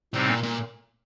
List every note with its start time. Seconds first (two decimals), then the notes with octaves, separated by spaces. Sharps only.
0.14 A2 C3 G3 C4 D#4
0.29 A#2
0.43 A#2